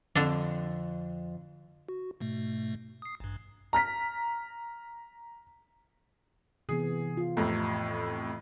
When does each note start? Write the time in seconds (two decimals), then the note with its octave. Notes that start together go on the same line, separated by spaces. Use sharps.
0.15 F2 D3 D4
1.89 F#4
2.20 G#2 B2 A3
3.02 D#6 C7
3.20 A1 G2
3.73 A#5 F6 B6
6.69 C3 E3 B3 G#4
7.17 F4
7.37 F2 A2 C3